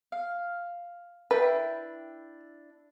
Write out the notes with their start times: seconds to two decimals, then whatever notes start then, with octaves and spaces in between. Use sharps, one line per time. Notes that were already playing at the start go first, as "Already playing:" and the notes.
0.12 F5
1.31 D4 E4 B4 G5